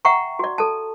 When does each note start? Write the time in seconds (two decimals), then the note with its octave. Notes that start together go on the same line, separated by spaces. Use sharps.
0.05 E5 F#5 G5 A#5 C#6
0.39 F#4 D5
0.58 A4 A5